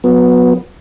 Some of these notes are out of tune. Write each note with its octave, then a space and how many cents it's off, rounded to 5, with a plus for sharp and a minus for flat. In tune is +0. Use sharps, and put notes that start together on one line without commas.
F#3 -30 B3 +0